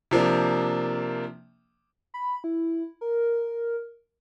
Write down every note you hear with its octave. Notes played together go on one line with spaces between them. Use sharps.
C3 F3 A#3 D4
B5
E4
A#4